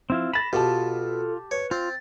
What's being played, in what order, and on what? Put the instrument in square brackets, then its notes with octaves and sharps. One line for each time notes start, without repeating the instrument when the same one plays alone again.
[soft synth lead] F3 [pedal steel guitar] C4 E4 F4
[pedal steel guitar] B5 [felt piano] A6 E7 [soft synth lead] A#6
[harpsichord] B2 [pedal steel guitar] F4 [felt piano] G4 A5 [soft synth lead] A4
[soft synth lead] B4 [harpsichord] C#5
[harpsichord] C4 [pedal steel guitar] F4 [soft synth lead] A6